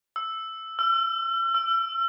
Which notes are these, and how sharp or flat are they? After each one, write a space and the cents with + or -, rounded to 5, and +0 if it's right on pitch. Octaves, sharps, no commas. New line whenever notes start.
E6 +0
E6 +45
E6 +40